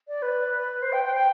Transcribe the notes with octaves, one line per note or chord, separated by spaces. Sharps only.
D5
B4
C5
G5
G5
G5